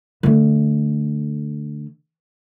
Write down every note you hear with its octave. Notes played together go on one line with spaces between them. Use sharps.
D3 A3